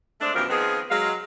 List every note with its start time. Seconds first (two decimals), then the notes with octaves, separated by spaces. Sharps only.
0.21 G#3 A3 C4 D4
0.35 F#2 B2 E3 F3 G4 A#4
0.49 D#3 F3 B3 C4 D#4 G#4
0.90 F#3 G#3 F5